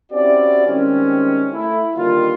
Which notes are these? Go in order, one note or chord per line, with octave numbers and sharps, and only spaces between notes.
C4 C#4 E4 F#4 G4 D5
D#3 G3 G#3 C4 C#4
A3 E4
D3 D#3 G3 A#3 F4